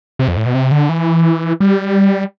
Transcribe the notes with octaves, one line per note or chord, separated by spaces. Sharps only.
C3
F2
A2
B2
C3
D3
E3
G3